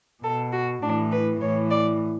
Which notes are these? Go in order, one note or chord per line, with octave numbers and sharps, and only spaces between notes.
B2 A4
F#4
A2 E3 D4
B4
A2 E3 C#5
D5